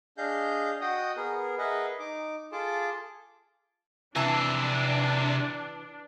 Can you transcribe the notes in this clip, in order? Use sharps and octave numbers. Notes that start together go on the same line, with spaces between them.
D4 G#4 D#5 F5 G6
F#4 D#5 F#5 G5 D#6
B3 G#4 A#4
G#4 A#4 B4 D#5 E5 F#5
D#4 D6
F4 G#4 A4 A5 D6
C3 E3 D4 G#4 A5